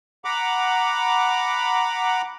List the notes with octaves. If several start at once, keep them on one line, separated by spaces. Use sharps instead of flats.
F#5 A#5 B5 D6